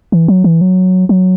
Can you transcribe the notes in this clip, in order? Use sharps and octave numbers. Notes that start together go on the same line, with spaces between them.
E3
F#3
E3
F#3
F#3